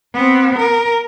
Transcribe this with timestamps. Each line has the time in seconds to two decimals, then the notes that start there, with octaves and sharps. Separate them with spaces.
0.14 B3 C4
0.59 A#4